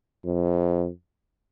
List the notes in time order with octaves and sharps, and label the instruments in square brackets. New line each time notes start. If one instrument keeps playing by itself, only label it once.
[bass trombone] F2